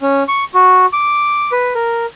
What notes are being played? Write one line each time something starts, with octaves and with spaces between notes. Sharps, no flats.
C#4
C#6
F#4
D6
B4
A#4